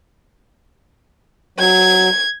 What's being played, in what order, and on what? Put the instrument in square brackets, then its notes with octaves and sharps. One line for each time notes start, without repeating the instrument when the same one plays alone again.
[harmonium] F#3 [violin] G#6